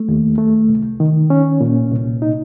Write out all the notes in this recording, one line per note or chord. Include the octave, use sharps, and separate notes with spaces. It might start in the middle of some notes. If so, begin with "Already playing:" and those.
Already playing: A3
D#2
A3
C2
D#3
C#4
A#2
C2
D#4